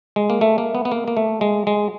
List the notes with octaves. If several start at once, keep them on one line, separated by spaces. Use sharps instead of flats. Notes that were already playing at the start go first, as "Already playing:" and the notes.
G#3
A#3
A3
A#3
B3
B3
A#3
A#3
A3
G#3
G#3